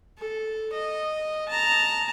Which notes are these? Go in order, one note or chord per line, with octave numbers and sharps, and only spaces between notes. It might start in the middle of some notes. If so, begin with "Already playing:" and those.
A4
D#5
A5 A#5